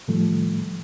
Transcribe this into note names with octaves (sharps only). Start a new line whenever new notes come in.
A2 D#3 F3 G3 A3